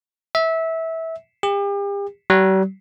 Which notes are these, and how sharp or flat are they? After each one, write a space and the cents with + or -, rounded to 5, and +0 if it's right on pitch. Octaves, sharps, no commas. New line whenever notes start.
E5 -20
G4 +40
G3 -45